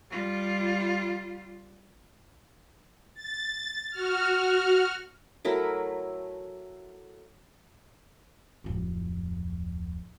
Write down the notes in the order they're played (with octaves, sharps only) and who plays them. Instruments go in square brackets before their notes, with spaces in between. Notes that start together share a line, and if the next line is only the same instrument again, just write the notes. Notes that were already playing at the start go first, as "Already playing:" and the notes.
[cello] G3 F4
[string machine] A6
F#4 F6
[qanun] F#3 A3 E4 A#4
[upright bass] D1 F2